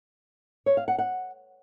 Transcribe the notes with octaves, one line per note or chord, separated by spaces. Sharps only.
C#5
F5
F#5
F#5